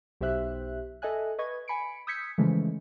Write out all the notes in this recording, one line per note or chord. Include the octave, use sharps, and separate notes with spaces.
B1 G4 C5 E5 F#6
A4 D#5 E5 G#5 F#6
B4 D#5 C#6 G#6
G#5 B5 C#7 D7
D#6 E6 G6 G#6 B6 C#7
C#3 E3 F3 G#3 A3